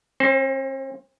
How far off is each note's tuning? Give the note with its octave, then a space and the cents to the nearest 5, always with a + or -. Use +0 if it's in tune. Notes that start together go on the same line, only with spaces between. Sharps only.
C4 +45 C5 +0